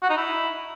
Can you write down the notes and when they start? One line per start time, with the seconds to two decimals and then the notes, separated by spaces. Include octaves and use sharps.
0.03 F#4
0.10 D#4
0.17 E4